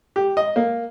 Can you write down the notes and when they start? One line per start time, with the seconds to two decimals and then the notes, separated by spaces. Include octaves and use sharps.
0.16 G4
0.37 D#5
0.56 A#3